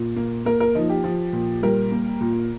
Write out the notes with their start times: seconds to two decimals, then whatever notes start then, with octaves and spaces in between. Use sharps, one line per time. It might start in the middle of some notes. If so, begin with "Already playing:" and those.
Already playing: A#2
0.16 A#3
0.45 A#3 A#4
0.60 A#4
0.75 F3 D#4
0.89 G4
1.04 F3
1.33 A#2
1.63 G3 A#4
1.92 A#3
2.21 A#2